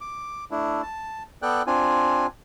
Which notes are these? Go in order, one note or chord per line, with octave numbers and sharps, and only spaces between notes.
D6
A3 D4 E4
A5
B3 A4 D5 G5 F#6
C4 D4 F4 G#5